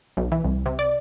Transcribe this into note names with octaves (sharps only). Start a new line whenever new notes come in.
B1
E3
C2
C3
D5